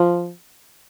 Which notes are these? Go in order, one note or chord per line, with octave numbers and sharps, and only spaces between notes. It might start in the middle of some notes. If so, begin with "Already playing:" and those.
Already playing: F3